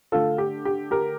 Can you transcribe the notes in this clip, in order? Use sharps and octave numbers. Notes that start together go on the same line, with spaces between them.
D3 A3 F4 A4
G4
G4
G4 A#4